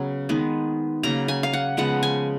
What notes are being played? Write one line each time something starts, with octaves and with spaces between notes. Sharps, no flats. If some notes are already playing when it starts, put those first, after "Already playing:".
Already playing: C#3 F#3 B3
D#3 G#3 B3
C#3 F#3 A#3 A#5
G#5
F5
F#5
C#3 F3 G#3 B3 F#5
G#5